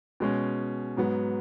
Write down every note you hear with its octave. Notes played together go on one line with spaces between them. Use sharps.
B2 G#3 C#4
G#2 F#3 B3